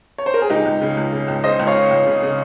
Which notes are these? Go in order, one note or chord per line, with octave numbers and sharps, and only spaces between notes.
C#5
C5
A#4
G#4
C#2 D#4 G4
C#2
C#3
C#2
C#3
C#2
C#3 C5 D#5
C#2
C#5 F5
C#3
C#2
C#3
C#3